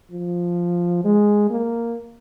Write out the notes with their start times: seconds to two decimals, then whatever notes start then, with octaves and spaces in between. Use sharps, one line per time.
0.12 F3
1.05 G#3
1.50 A#3